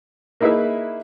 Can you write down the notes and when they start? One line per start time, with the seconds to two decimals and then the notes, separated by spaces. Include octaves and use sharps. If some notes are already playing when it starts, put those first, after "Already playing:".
0.40 A#3 D#4 E4 G#4 B4 E5